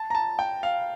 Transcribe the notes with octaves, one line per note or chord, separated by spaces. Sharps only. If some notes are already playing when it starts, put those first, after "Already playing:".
Already playing: A5
A#5
A5
G5
F5